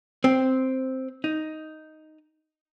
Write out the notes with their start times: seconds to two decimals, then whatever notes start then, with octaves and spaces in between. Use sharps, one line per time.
0.24 C4
1.24 D#4